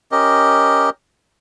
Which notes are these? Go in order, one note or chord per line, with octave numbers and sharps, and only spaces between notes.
C#4 G4 A#4 D#5